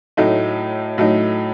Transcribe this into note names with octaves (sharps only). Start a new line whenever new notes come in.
A2 F#3 A3 D#4
A2 F#3 A3 D#4